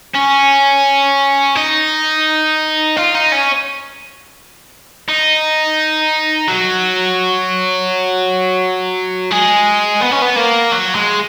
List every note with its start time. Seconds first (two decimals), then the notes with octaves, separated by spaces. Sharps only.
0.14 C#4
1.56 D#4
2.97 F4
3.15 D#4
3.32 C#4
5.09 D#4
6.48 F#3
9.31 G#3
10.01 B3
10.11 C#4
10.22 B3
10.36 A#3
10.72 F#3
10.95 G#3